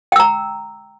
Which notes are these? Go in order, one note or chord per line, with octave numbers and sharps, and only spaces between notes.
G5 A#5 E6